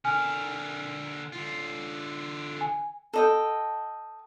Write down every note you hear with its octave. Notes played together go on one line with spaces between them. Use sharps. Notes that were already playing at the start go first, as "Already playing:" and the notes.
D3 A#4 G#5 F6
D3 F4
G#5
A4 D#5 G5